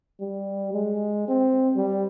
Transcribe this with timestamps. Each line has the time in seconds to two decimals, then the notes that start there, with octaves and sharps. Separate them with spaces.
0.21 G3
0.73 G#3
1.28 C4
1.76 G3